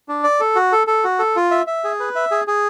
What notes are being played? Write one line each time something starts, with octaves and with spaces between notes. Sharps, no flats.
D4
D5
A4
F#4
A4
A4
F#4
A4
F4
E5
E5
G#4
B4
E5
G#4
G#4